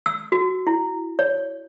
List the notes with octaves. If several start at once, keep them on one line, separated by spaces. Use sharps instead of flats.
E6
F#4
E4
C#5